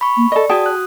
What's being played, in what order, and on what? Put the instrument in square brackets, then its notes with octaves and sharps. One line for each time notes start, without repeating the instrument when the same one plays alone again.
[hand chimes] B5 C#6
[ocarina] A#3
[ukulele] A4 D#5 [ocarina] D5
[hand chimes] F#4 D#6 [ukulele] G#4 G5 A5
[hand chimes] F#6